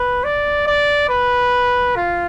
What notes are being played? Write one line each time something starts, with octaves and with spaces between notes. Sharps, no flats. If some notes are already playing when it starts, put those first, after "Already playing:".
Already playing: B4
D5
D5
B4
F4